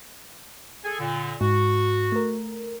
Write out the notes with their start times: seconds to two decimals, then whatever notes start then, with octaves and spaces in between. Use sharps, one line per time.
0.85 G#4 A4 G#5
1.00 A#2 D3
1.41 G#2 F#4
2.12 A3 A#4